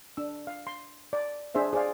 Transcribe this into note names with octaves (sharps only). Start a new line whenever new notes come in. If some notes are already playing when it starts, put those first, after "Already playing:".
D4 E6
F5
C6
D5
D4 G#4 C5 E5
G#4 C5 D5 F5